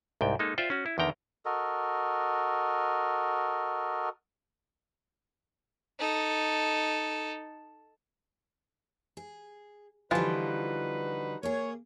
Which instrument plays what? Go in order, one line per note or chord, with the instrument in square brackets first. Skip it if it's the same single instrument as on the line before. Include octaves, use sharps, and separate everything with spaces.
[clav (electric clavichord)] C2 G#2 G5
G#3 A#3 D#4 A4
F4 C5 D5 E5 G5
C#4 F#4
E4
E2 D3 D#3 G5 A#5
[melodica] F#4 A4 A#4 D#5
[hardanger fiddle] D#4 A4
[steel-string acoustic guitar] G#4
[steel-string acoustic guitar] D3 G3 [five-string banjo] E3 F3 F4 [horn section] D#4 F#4 B4
[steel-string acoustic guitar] A#3 G#4 [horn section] C#5